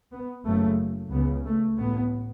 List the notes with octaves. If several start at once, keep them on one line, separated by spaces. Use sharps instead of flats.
B3
F#1 F#2 C#3 A3
C#2 C#3 B3
A3
A1 A2 B3